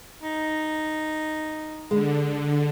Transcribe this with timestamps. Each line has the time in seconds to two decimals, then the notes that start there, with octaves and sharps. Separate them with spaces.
0.22 D#4
1.91 D3 G#3